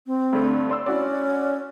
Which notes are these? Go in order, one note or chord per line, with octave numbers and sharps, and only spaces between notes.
C4
G2 D3 A3
D5 C6 E6
C#4 E4 F#4 D5